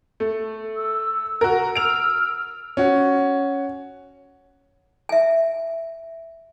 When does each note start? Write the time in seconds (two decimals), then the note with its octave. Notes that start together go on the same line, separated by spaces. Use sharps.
0.20 A3
0.76 E6
1.41 F#4 A#4
1.75 E6 F6 D7 F7
2.77 C#4 F#4
5.09 E5 G#5